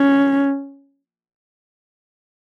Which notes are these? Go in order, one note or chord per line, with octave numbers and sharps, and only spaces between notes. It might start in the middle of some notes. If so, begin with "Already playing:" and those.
Already playing: C#4